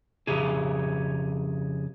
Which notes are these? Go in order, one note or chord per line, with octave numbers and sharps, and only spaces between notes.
F2 C#3 G4 G#4